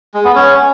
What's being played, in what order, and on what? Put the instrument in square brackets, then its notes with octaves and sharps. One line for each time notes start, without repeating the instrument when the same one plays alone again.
[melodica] G#3
B3
C#4